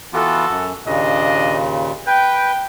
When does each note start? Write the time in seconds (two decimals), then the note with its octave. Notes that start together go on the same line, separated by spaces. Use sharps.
0.13 E3 B3 F4 F#4 A4
0.50 F#2
0.86 D#2 A#2 C#3 D4 D#5
2.06 B4 G5